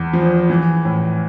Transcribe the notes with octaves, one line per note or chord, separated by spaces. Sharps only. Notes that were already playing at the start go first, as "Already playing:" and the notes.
Already playing: E2
F3
E3
A2